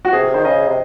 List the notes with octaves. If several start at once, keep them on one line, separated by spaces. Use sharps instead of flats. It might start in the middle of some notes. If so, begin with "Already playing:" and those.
F#4
C3 G#4
G#4
D#3 C5
C#3 D#5
C3